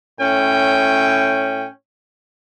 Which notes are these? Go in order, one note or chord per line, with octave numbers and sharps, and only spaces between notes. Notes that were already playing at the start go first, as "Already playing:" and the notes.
A2 C#4 G5